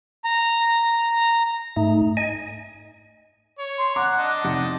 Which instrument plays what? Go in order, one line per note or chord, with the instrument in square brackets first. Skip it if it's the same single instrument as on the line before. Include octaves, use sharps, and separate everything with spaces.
[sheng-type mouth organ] A#5
[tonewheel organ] G#2 A3 D#4
D#5 G#5
[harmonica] C#5
[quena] C6
[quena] F#5 [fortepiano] A#5 D6
[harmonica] D4 D#5 A5
[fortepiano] F2 C3 F#5 [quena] D#4